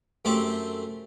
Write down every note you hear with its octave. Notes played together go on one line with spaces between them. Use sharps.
F#2 A3 C4 G4 A5 D6